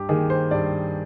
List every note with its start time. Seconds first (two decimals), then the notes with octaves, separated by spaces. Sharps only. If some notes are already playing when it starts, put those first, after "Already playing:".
Already playing: G2 G4
0.09 D#3 A#3 G#4
0.30 C5
0.51 G2 D5